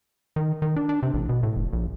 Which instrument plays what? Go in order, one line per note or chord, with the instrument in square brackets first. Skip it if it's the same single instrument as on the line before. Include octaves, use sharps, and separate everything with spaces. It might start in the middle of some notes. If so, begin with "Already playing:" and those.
[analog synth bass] D#3
D#3
D4
D4
C3
A1
B2
A2
F1
A#1